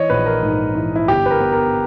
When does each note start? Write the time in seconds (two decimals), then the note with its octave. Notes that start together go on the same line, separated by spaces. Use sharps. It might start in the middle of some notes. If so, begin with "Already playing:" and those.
Already playing: E3 C#5 D#5
0.10 A#1 B4
0.26 A#4
0.43 G#2
0.75 E3
0.96 E4
1.08 G1 G4
1.26 B4
1.31 A#4
1.40 B3
1.52 A#4